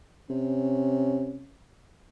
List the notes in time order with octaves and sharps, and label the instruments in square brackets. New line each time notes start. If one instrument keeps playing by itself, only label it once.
[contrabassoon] C3 [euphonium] C#4